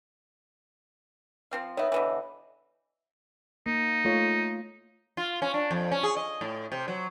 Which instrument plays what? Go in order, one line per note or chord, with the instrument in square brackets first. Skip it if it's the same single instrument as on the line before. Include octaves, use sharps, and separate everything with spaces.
[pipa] F3 C4 F5
[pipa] D#3 B3 [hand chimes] C#5 E5
[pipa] B2 D3 E3
[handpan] A#3 [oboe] D#4
[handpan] A3 F4 C#5
[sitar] F4
C#4
D4
F2
C#4
G#4
D#5
A2
C3
F#3